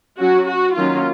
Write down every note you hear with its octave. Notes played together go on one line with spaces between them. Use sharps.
F#3 C#4 F#4
F#4
D#3 F#3 A#3 C#4 F4